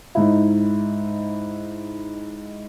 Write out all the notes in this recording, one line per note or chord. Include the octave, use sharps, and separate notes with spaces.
G#2 D#4 E4